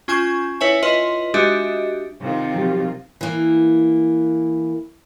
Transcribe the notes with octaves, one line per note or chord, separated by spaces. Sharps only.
C#4 F4 G#5 C#6 G6 E7
E4 B4 C#5 E5 G#5
F4 B4 D#5 C6
G#3 D4 F#4 G4 D#5 E5
C3 D#3 F4
F3 F#3 G4
E3 A#3